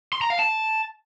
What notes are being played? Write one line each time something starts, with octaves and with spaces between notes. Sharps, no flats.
C6
A#5
F5
A5